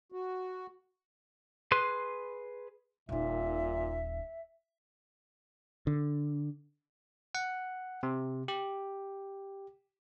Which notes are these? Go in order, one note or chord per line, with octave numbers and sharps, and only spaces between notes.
F#4
G#4 B4 C6 F#6
D#1 A#2 D#4 E5
D3
F#5
C3
G4